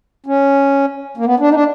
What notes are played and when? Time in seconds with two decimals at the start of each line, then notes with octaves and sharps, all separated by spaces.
0.26 C#4
1.17 A#3
1.25 B3
1.40 D4
1.50 D#4
1.54 D4